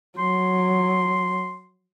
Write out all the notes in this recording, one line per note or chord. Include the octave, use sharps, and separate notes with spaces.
F#3 C6